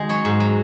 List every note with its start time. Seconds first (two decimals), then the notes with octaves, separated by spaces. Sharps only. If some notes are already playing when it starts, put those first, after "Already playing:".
Already playing: D#3 G#3 F#4 G#4
0.09 F#3 C#5
0.25 G#2
0.40 F#3